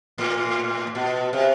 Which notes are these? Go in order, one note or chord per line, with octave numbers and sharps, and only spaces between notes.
A2
B2
C3